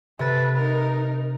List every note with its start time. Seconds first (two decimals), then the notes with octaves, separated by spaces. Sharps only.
0.19 C3 A4 B4 A6
0.55 D#4 A#4